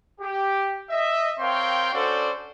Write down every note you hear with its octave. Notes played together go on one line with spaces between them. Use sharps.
G4
D#5 E5
C4 A#4 C#5 F5 G5 C6
C#4 D4 F#4 A4 C5 D5